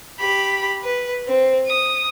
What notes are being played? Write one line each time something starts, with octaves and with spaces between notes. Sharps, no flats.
G4 B5
B4
C4
D#6